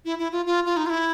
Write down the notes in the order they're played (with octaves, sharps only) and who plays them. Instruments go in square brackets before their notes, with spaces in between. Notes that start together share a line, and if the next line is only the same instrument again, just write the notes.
[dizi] E4
E4
F4
F4
F4
D#4
F4
E4